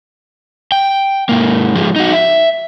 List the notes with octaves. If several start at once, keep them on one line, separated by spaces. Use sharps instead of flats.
G5
G#2 A#3
F3 G#3
D#4 F#4
E5